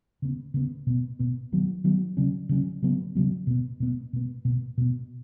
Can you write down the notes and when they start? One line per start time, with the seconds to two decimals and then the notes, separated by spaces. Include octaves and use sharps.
0.22 C#3 B3
0.54 C#3 B3
0.87 B2 B3
1.19 B2 B3
1.52 D#3 F#3 B3
1.84 D#3 F#3 B3
2.17 C#3 F#3 C#4
2.49 C#3 F#3 C#4
2.82 C#3 F#3 B3
3.15 C#3 F#3 B3
3.47 B2 B3
3.80 B2 B3
4.13 B2 B3
4.45 B2 B3
4.77 B2 B3